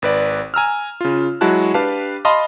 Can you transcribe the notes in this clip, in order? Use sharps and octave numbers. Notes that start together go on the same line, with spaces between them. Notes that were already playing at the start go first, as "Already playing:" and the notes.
G#1 B4 D5
G#5 A#5 E6 F6
C#3 F4
F#3 G#3 E4 F#4 A5 F#6
D4 G4 B4 F5 A5
D#5 F5 A5 B5 C6 D#6